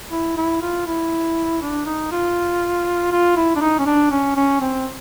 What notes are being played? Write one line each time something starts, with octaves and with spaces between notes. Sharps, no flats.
E4
E4
F4
E4
D4
D#4
F4
F4
E4
D4
D#4
C#4
D4
C#4
C#4
C4